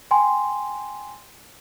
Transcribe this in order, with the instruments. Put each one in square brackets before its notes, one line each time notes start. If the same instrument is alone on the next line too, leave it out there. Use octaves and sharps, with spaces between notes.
[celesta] G5 G#5 C6